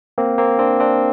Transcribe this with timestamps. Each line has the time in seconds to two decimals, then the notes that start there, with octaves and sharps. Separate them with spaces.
0.18 A#3 C4
0.38 A#3 C4
0.59 C4 D4
0.80 C4 D4